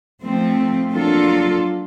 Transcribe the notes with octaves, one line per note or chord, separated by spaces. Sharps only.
F3 A3 C4
F#3 A#3 D4 F4 A4